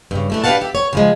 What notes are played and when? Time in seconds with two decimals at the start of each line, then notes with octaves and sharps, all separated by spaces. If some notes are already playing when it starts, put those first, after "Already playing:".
0.11 G2 C#3
0.30 E3 A3 D4
0.44 D4 G4 B4 F5 F#5 A5
0.61 G4 E5
0.75 C#5
0.93 C#3 F3 G#3